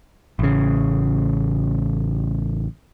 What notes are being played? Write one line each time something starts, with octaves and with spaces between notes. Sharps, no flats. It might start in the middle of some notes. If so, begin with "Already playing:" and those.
A1 C#3